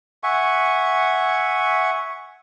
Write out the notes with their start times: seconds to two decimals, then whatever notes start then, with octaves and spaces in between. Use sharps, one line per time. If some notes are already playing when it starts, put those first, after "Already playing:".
0.23 E5 F#5 G#5 C#6